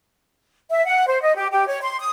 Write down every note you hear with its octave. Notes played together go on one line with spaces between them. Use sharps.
E5
F#5
C5
D#5
G4
G4
C#5
C6
D#6